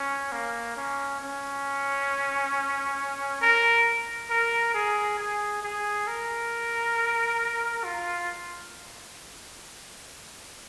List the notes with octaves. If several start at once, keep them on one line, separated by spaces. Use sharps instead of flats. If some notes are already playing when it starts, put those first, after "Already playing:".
Already playing: C#4
A#3
C#4
C#4
A#4
A#4
G#4
G#4
G#4
A#4
F4